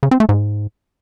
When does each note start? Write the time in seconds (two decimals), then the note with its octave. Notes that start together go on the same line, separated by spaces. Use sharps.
0.03 C#3
0.11 C4
0.20 A3
0.29 G#2